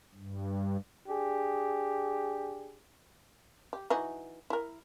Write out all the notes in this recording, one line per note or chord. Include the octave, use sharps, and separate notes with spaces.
G2
D4 G4 G#4
G4
E3 D#4 F#4
E4 A#4